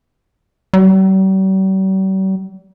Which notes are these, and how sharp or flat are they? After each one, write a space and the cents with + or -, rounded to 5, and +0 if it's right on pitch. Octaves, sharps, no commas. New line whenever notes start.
G3 -45